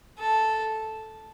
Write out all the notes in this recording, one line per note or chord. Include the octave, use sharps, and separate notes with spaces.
A4